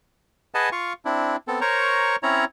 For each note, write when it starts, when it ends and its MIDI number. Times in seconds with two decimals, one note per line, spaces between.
0.55 0.69 68
0.55 0.69 71
0.55 0.69 75
0.55 0.69 78
0.55 0.69 80
0.55 0.69 81
0.72 0.93 65
0.72 0.93 77
0.72 0.93 85
1.05 1.36 60
1.05 1.36 62
1.05 1.36 64
1.48 1.60 59
1.48 1.60 60
1.48 1.60 69
1.61 2.16 70
1.61 2.16 72
1.61 2.16 73
1.61 2.16 82
1.61 2.16 85
2.23 2.45 60
2.23 2.45 61
2.23 2.45 64
2.23 2.45 73
2.23 2.45 82